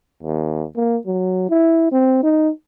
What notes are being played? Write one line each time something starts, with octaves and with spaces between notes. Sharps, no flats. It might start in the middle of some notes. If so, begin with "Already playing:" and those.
D#2
A#3
F#3
E4
C4
D#4